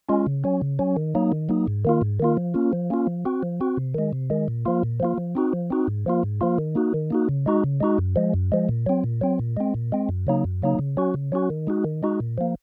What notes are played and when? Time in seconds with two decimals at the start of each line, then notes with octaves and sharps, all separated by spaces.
0.09 G#3 C#4 F4
0.27 C#3
0.44 F#3 C#4
0.62 C#3
0.79 F#3 C#4
0.96 D#3
1.15 F#3 A#3 D#4
1.32 D#3
1.49 F#3 A#3 D#4
1.68 G#2
1.85 D#3 A#3 F4
2.01 G#2
2.20 D#3 A#3 F4
2.37 F3
2.54 A#3 C#4 F4
2.73 F3
2.90 A#3 C#4 F4
3.07 F3
3.25 C4 F#4
3.43 F3
3.61 C4 F#4
3.77 C3
3.94 D#3 G#3
4.13 C3
4.30 D#3 G#3
4.48 A#2
4.65 F3 A#3 F4
4.83 A#2
5.00 F3 A#3 F4
5.18 F3
5.35 C4 D#4 F#4
5.53 F3
5.70 C4 D#4 F#4
5.87 G#2
6.06 F3 A#3 F4
6.23 G#2
6.41 F3 A#3 F4
6.58 D#3
6.75 A#3 D#4 F#4
6.94 D#3
7.10 A#3 D#4 F#4
7.29 C#3
7.46 G#3 D#4 F#4
7.64 C#3
7.80 G#3 D#4 F#4
7.98 F#2
8.16 F3 G#3
8.34 F#2
8.52 F3 G#3
8.69 A#2
8.86 F#3 C4
9.04 A#2
9.21 F#3 C4
9.39 A#2
9.57 G#3 C4
9.74 A#2
9.92 G#3 C4
10.09 F#2
10.27 C#3 F#3 A#3 D#4
10.44 F#2
10.62 C#3 F#3 A#3 D#4
10.79 C#3
10.97 F#3 C#4 F#4
11.14 C#3
11.32 F#3 C#4 F#4
11.50 D#3
11.67 G#3 D#4 F#4
11.84 D#3
12.03 G#3 D#4 F#4
12.20 A#2
12.38 F3 A#3